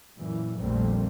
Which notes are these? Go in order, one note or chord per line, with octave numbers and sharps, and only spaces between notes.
F#2 A#2 E3
A#1 F2 A#2 G3 A3 C4